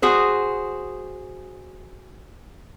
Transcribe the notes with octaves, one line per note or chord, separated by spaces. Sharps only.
F#4 G#4 C5